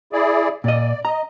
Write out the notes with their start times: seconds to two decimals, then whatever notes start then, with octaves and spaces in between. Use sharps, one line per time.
0.13 E4 G#4 D5
0.64 A#2 D5 D#5
1.05 D#5 A#5